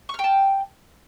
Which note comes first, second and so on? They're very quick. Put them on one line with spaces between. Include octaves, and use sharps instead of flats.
C#6 F6 G5 A5